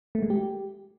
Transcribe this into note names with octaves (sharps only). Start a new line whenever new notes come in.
A3
G#3
G4